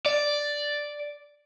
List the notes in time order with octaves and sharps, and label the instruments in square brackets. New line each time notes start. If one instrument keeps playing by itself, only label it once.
[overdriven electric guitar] D5